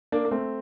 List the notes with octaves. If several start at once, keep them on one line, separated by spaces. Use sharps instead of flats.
A#3 D4
A#3
A3 C4